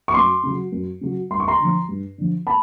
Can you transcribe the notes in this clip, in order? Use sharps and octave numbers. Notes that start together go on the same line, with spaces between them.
C#6
F#2 C6 D6
C#3
F#3
F#2
C#3 F#3
G2 C6
C#6
A#5 C6
D3
F3
G2
D3 F3
A5 B5